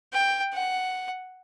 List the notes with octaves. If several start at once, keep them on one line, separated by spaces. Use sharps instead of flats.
G5
F#5